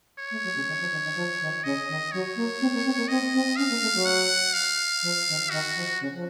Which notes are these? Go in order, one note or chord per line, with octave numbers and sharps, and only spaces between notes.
C#5
A3
F#3
C#3
D#3
F3
D#3
D#3
F3
D#3
C#3 D#5
D#3
F#3 C#5
A#3
C4
A#3
C4
A#3
C4 D#5
C4
C#4 F5
A#3
A3
F#3
F#5
F5
F3
D#3
D#3 F#4
F3
C#3
F3